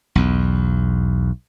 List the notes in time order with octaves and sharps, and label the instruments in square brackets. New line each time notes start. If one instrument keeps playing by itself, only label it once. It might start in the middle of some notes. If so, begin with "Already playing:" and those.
[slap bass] B1 E2